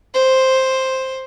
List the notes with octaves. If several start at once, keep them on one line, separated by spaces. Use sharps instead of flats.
C5